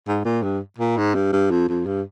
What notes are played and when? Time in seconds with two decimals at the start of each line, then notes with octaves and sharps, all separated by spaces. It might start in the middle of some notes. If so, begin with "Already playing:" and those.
0.07 G#2
0.25 A#2
0.43 G2
0.78 A#2
0.97 G#2
1.15 G2
1.32 G2
1.51 F2
1.69 F2
1.86 G2